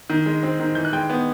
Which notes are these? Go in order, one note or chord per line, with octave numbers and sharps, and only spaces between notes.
D#3
G#3
C4
D#3
E3 G6
F#6
G#3 G5 G6
B3